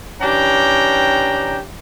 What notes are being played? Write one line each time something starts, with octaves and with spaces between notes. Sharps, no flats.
E3 C#4 D4 G4 G5 A#5